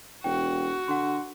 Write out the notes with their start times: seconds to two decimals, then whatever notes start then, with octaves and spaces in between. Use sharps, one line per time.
0.24 E1 F#4 G5
0.88 D3 F#5 C6